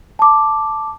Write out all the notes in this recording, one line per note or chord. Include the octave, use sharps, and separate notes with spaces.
A5 D6